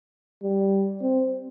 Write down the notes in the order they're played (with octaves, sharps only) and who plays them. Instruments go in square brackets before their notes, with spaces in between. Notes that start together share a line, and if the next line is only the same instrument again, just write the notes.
[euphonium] G3
C4